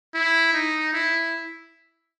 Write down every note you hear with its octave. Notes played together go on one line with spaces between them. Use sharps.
E4
D#4
E4